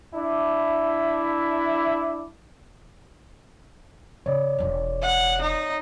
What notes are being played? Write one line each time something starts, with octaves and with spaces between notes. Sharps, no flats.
D4 E4
C#3 C#5 D5
E1 F4
F#5
D#4